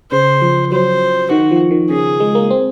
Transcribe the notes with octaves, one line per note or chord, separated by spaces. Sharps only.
C#3 C5
F3
F#3 C5
D#3 F#4
F3
D#3
C#3 G#4
G#3
A#3
C4